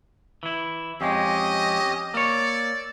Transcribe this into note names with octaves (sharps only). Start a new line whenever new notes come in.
E3 E4
F2 G#3 C#4 G4 D#5
A#3 C#5 D5 E6